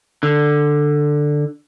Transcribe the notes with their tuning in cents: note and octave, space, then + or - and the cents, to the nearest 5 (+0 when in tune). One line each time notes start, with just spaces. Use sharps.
D3 +10